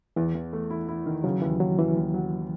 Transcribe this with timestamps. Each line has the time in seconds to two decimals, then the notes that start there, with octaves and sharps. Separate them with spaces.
0.16 E2 E3
0.34 E2
0.53 A3
0.70 E4
0.89 E4
1.06 D#3
1.24 C#3 F#3
1.42 D#2 E3
1.60 D#2 F#3
1.78 E3 F#3
1.96 D#2
2.14 F#3